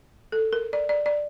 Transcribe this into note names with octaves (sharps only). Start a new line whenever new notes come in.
A4
A#4
D5
D5
D5